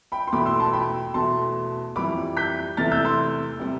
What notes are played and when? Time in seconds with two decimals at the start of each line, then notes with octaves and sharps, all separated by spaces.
0.12 G5 B5
0.27 C6
0.32 E2 B2 A3 B5 D6
0.46 C6 E6
0.60 A5 C6
0.73 G5 B5
1.14 E2 B2 A3 A5 C6
1.96 F2 E3 G3 B5 D6
2.37 G6 B6
2.77 E2 C3 E3 A3 F6 A6
2.91 E6 G6
3.05 C6 E6
3.59 C3 G3